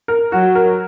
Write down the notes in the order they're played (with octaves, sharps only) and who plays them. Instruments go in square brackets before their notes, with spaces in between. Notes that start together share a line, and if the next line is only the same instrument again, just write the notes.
[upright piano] A#4
[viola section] F#3 [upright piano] F#4
[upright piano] A#4